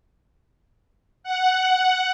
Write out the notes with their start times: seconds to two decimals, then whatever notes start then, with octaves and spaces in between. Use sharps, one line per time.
1.23 F#5